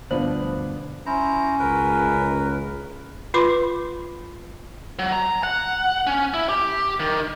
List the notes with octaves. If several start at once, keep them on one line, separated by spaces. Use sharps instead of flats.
D2 G2 B2 F3 B3 D4 C5
C#4 E4 C5 A#5
C#2 A#4 B4
F4 B4 B5 C6 D6
F#3
A#5
F#5
C#4
E4
G4
D#3